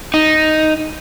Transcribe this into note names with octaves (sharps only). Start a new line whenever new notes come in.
D#4